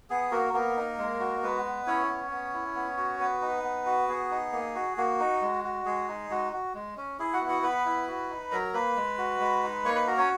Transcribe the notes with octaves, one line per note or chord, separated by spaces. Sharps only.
B3 G#4
A#3 F#4 A#4
A#3 B3 A#4
D#4
G#3
F#4
G#3 B3 B4
B3
C#4 E4 C#5
B3
B3
E4
B3
F#4
B3 B4
D#4
B3
F#4
B3 G#4
D#4
A#3
F#4
A#3 F#4
D#4
G#3
F#4
G#3 G#4
D#4
G#3 F#4
F#4
G#3
C#4
E4 G#4
F#4 F#5
B3
F#4 F#5
B3 B4 B5
E4
F#4
D#4
F#3 A#4 A#5
A#3 B4 B5
G#3
F#4
G#3
D#4
A#3 C#5 C#6
B4 B5
F#4 A#4 A#5
C#4 C#5